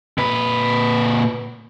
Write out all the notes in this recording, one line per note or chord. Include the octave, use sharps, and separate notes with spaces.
A#2 B4